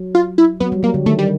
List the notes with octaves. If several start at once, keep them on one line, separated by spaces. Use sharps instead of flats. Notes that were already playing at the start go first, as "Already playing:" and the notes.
Already playing: F#3
F4
E4
F#3 B3
G3
F#3 A#3
D3
D#3 A3
G3